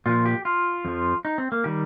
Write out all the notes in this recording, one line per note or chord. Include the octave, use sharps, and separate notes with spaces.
A#2 F3 F4
G4
F4
F2 F3
D#4
C4
A#3
D#3 G3 G4